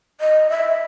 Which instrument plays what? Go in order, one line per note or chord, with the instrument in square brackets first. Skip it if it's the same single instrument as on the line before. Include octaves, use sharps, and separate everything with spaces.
[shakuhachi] D#5
E5